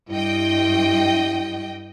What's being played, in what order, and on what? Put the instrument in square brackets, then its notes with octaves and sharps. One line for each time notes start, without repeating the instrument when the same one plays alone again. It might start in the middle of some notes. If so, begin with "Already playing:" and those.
[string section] G2 D#5 G5 [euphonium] E4